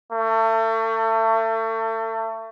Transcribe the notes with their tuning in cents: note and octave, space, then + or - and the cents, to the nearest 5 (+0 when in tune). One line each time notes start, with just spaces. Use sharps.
A3 +35